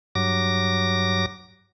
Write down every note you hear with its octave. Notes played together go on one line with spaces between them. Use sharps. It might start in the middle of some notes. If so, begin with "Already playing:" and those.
G2 F#3 D6 A#6